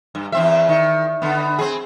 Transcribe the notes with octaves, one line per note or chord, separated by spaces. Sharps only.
G2
E2 C4 E5
D#3
D3 B3
C4 G#4